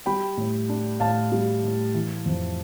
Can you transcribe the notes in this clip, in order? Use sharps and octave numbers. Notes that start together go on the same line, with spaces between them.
G3 G5 B5
A2
D4
A2 F5 A5
G3
A2
E3
F2